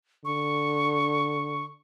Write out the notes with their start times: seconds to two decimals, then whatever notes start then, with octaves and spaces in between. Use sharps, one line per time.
0.25 D3 C#6